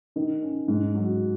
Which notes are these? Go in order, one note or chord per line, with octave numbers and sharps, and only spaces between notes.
D#3
C#4
G#2
F#3